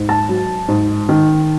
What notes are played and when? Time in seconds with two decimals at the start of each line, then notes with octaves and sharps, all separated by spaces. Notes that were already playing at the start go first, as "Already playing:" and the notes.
Already playing: G#2
0.09 A5
0.29 F#3
0.68 G#2
1.09 D#3